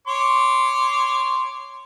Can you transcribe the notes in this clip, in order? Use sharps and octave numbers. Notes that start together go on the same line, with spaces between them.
C#5 C6 D6